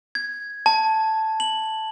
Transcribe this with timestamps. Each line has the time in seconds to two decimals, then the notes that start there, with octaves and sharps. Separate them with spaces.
0.15 G#6
0.66 A5
1.40 F#7